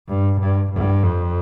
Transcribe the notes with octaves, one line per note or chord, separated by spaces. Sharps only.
G2
G2
G2
F2